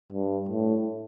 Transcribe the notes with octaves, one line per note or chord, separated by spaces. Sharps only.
G2
A2